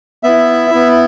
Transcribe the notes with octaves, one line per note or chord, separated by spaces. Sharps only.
B3 E4 E5
B3 E4